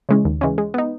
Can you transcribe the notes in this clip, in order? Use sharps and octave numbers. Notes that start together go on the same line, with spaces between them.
C#3 E3 G#3 C#4
D#2
C#3 E3 G#3 C#4
G#3
B3 D#4